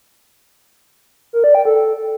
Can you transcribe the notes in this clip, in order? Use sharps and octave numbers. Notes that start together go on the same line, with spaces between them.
A#4
D5
G5
A4